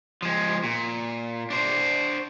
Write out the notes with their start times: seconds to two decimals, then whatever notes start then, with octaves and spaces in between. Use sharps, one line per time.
0.22 F3 G#3
0.64 A#2
1.50 D4 C5